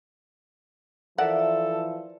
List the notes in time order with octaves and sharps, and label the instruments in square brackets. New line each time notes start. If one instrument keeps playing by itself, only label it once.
[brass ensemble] E3 F3 [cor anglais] A4 [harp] A#4 D5 E5 [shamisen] F#5